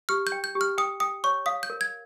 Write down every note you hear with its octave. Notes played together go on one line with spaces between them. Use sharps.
G4 F6
G6
G5
G6
G4
F6
G5 D#6
G5 D#6
C#5 C#6
F5 D#6
G6
A#4
G#6